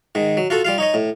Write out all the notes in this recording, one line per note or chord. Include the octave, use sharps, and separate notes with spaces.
G#2 D#3
F#3
F4 F#4 A4
G3 F4 F5
D#4 C#5 D#5
A2